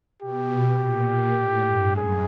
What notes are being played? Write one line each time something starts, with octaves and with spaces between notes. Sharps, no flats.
B2 G4
A#2
A#2
A2
G2
F#2 G#4